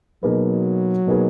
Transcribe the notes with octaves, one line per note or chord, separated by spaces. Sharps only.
B2 F#3 A#3 D#4 G#4 B4
B2 A#3 D#4 G#4 B4